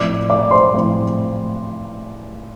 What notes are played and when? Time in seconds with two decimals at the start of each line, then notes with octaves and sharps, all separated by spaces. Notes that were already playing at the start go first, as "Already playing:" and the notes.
Already playing: A2 F3 C4 D5 D6
0.30 D5 D6
0.51 C5 C6
0.73 A2 F3 C4